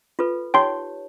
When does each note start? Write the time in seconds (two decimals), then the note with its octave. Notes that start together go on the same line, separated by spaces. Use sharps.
0.19 F4 A4 B4
0.54 D#4 G4 C#5 G5 C6